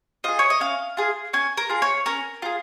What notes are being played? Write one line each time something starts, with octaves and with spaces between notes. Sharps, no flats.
F4 G#4 D#5
C#5
D#5
C#4 F5
F4 G#4
C#4 G#5
A#4
F4 G#4
C#5
C#4 A#4
F4 G#4